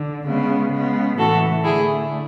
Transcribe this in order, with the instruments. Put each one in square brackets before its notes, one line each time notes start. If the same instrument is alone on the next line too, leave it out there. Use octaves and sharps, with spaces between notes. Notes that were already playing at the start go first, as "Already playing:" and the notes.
Already playing: [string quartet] D3
C#3 G#3 B3
C#3 G#3 B3
A2 E3 A3 F#4 A4
D3 A3 E4 G#4